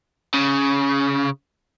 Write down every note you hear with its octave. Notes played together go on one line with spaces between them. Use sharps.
C#3